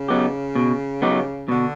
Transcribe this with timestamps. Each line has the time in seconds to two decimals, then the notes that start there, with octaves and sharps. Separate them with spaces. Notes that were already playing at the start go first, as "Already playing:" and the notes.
Already playing: C#3
0.08 F#3 B3 D#4 G4
0.55 B2
1.02 F#3 B3 D#4 G4
1.48 B2 D3